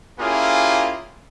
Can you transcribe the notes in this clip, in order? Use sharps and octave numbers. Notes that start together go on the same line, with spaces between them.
A#3 C#4 E4 F4 G4 G#4